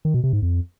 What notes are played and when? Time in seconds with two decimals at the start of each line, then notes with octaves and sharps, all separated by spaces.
0.05 D#3
0.14 B2
0.24 C3
0.33 G#2
0.42 F2